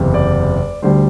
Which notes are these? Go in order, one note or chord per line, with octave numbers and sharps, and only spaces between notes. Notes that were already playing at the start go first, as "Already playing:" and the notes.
Already playing: F#1 E2 C3
D5
D2 D3 G3 C5